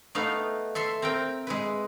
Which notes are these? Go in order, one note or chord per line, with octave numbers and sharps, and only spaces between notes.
A3 B3 D#4 F5
A4 E5 C6
C4 A#4 G5
G#3 E4 B4